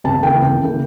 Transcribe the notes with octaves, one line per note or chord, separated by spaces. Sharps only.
C#2 A5
C#3 E3 A#3 G5
C#2
C#3 E3 A#3